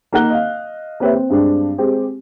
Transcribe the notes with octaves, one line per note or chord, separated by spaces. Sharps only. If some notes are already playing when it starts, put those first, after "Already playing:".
A#3 D#4 A#4 F#5 F#6 G7
D#5 F5
A#3 C4 G4 B4 C#5 E5
C4
G2 G#3 C4 D4
G#3 C4 G4